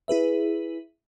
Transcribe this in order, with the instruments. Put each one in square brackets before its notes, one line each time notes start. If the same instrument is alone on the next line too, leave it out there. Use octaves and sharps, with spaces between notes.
[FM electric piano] E4 G#4 B4 E5